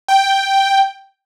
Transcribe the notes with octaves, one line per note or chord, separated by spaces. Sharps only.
G5